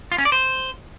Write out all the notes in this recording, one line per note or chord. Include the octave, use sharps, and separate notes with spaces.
F4
C#4
D5
C5